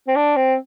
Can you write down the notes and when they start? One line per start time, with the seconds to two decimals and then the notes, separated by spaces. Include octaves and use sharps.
0.08 C4
0.16 D4
0.36 C4